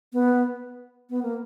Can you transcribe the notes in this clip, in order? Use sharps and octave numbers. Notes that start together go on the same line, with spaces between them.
B3
B3
A#3